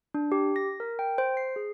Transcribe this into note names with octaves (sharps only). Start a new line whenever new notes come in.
D4
G4
A#6
A#4
G5
C5
C7
G#4